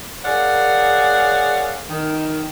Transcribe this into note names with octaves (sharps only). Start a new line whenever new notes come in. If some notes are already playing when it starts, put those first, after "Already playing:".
G#4 A#4 C#5 D5 F5 F#5
D#3